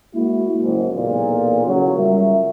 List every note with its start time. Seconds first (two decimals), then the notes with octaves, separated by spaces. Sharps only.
0.15 G#3 A#3 E4 F#4
0.61 F#1 G#2
0.93 B1 E2 A#2
1.66 C#3 F#3
1.96 C#2 G3 A#4 E5